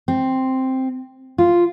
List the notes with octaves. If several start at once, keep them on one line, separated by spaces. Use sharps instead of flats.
C4
F4